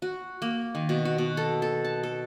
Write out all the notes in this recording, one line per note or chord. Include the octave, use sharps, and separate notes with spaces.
F#4
A#3
D#3
B2
F#4
B2
A4
A4
A5
A4